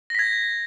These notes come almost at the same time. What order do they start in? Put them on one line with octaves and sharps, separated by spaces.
A#6 B6 G#6